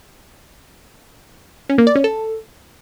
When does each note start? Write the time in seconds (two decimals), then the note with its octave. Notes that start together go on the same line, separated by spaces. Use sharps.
1.69 C#4
1.78 A#3
1.87 D5
1.95 C#4
2.04 A4